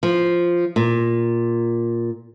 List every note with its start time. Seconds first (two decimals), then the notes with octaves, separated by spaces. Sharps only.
0.03 F3
0.76 A#2